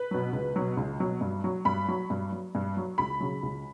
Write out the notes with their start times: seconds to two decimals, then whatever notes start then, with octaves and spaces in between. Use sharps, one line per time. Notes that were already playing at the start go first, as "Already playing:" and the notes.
Already playing: B4
0.11 B2 F#3
0.33 C#2
0.56 B2 F#3
0.77 C#2
1.00 B2 F#3
1.21 G2
1.44 F#3
1.65 G2 B5
1.88 F#3
2.10 G2
2.32 F#3
2.55 G2
2.77 F#3
2.98 C#2 B5
3.20 C#3 F#3
3.43 C#2